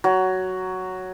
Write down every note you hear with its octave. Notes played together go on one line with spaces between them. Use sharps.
F#3